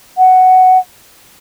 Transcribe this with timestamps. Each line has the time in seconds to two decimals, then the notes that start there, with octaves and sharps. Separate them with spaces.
0.17 F#5